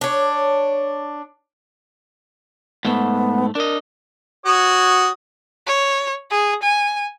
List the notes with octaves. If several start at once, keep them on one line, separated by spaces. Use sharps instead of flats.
D4 C#5
G#2 A3 B3
D4 A#4 D#5
F#4 C#5 D#6
C#5
G#4
G#5